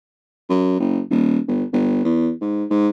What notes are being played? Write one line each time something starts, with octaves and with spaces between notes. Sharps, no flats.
F#2
F#1
D#1
G1
G1
E2
G#2
G#2